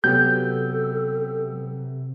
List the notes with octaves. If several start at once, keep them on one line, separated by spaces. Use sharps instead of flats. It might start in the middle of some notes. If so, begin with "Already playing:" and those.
C3 F#3 B3 G4 A4 G6